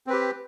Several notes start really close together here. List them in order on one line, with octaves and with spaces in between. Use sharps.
C4 B4 G4